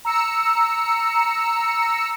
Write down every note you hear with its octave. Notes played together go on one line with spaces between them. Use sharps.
A#5 E6 C#7